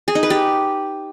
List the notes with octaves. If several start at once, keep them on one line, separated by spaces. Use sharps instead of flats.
G#4
D#4
B4
G4